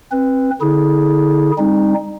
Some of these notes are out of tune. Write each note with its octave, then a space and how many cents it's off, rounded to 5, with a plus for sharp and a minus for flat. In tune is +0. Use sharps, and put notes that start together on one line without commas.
C4 +25 B4 +0
D3 +0 E4 -35 G#4 +0
G3 +40 C4 +25 D#4 +0